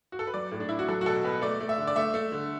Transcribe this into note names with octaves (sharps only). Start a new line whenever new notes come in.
F#4
A4
B4
F#3 D5
A2
D4
A2 E4
F#4
F#3 A4
F#4
B2 A4
B2 B4
A3 D5
A3
E5
D3
D5
A3 E5
A3
D3